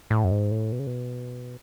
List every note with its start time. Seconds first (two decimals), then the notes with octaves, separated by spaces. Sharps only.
0.10 A2
0.24 F#2
0.31 G#2
0.51 A2
0.72 B2
0.79 C#3
0.87 B2